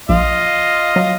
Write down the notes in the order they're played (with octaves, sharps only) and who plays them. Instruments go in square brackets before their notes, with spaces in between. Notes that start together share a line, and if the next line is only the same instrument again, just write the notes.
[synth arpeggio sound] A#1 [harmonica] F4 D#5 F5
[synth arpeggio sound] F#3